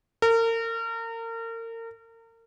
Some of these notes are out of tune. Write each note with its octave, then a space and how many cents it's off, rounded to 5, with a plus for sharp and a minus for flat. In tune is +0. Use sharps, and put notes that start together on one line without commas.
A#4 -35